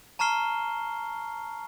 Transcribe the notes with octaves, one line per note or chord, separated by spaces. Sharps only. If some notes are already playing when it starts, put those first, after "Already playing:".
A5 A#5 C#6 F6 C7 G7